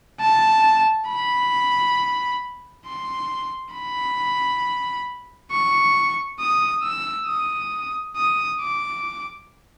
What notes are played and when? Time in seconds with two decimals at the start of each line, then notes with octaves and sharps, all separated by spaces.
0.20 A5
1.08 B5
2.86 C6
3.74 B5
5.51 C#6
6.40 D#6
6.83 E6
7.28 D#6
8.17 D#6
8.61 D6